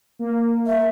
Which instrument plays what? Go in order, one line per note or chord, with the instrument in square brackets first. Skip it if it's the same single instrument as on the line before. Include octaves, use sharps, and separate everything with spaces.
[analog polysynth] A#3
[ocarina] E5